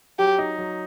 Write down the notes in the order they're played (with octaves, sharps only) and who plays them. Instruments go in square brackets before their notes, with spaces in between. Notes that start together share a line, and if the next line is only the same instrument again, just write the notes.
[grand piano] F#3 [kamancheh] G4
[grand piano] D#4
F#3